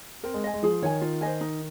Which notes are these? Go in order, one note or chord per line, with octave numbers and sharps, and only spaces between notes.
C4 A#4
G#3
D#5 G#5
G#3
F3 G#4
D#3 C#5 G#5
F4
C5 D#5 G#5
D#4